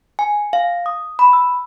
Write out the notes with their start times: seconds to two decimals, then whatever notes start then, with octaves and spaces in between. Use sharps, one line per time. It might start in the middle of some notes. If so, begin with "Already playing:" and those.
0.19 G#5
0.53 F5
0.86 D#6
1.19 B5
1.33 E6